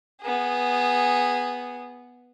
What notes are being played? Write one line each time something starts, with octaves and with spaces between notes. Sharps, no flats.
B3 G#4